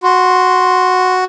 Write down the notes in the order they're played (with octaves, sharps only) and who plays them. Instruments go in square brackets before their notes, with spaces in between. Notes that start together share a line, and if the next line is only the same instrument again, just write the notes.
[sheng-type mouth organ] F#4 [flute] C6